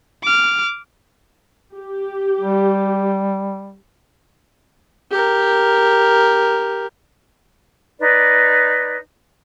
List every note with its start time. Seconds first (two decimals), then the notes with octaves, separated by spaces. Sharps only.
0.23 D6 F6
1.75 G4
2.39 G3
5.11 G4 A#4
7.99 D#4 B4 D5